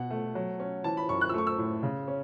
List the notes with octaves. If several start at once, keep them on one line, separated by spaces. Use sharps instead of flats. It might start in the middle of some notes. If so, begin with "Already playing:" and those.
Already playing: B2 F#5
A3
F#3
C#4
E3 A5
B5
F#2 C#6
F#6
E6
A3 C#6
E6
A2
C#3
C#4